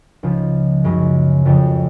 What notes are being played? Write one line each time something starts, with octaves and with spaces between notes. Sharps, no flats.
C#2 C#3 F3
F#2 C#3 G#3 C#4
F2 C#3 F3